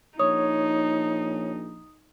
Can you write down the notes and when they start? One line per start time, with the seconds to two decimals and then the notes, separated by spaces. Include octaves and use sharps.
0.19 A#1 D#4 C#5 D#6